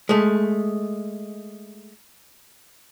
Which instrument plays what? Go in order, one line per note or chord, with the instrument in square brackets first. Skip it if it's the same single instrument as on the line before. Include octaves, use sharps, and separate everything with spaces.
[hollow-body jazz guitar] G#3 A3